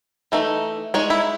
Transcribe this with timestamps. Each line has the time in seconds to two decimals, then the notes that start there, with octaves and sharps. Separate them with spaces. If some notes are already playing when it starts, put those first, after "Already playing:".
0.32 E3 A3 D#4
0.94 G#3 D#4 C#5
1.10 E4